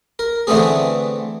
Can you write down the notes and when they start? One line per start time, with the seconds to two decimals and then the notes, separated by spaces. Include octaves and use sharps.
0.19 A#4
0.47 D3 E3 A3 B3 C4 G#4